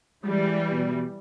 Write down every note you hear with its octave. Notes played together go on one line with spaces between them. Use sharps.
E3 G3 G#3
B2